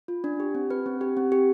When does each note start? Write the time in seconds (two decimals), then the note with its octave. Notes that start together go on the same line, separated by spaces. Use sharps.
0.08 F4
0.24 D4
0.40 G4
0.55 C4
0.71 B4
0.86 C4
1.01 G4
1.17 C4
1.32 G4